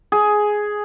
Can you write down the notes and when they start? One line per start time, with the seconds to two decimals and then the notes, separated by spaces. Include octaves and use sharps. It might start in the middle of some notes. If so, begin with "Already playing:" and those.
0.12 G#4